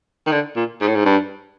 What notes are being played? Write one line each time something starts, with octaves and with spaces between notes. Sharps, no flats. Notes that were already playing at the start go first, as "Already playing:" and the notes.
D#3
D3
A#2
G#2
A2
G#2
G2